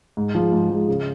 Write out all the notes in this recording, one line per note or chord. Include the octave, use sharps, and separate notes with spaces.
G#2
F3 G#3
G#2
F3 G#3
C#3